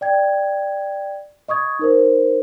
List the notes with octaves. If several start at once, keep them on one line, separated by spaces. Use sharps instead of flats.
D5 G5 G#6
D#5 C#6 D#6 G#6
D#4 A#4 C5